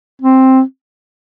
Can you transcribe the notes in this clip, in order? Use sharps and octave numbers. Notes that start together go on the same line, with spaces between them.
C4